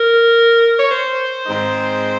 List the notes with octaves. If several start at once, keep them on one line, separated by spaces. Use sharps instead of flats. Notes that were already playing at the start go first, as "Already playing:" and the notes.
Already playing: A#4
C#5
C5
G#2 D#3 G#3 C4 D#4